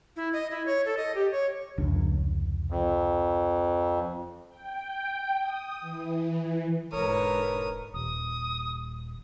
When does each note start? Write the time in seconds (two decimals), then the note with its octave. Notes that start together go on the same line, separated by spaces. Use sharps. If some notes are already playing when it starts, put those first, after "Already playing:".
0.16 E4
0.33 D#5
0.51 E4
0.66 C#5
0.86 A4
0.97 D#5
1.15 G4
1.32 C#5
1.78 F1 C#2 D4
2.70 F2
4.49 G5
5.39 D#6
5.81 E3
6.92 E1 G#2 D3 A#4 B4 C#5 D#6
7.94 D#1 D#6